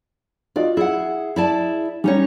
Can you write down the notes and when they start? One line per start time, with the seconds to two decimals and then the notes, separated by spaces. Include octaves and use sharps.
0.56 F4 F#4 D5 D#5
0.77 E4 G#4 F#5
1.36 E4 D5 A5
2.04 G3 C#4 D#4 C#5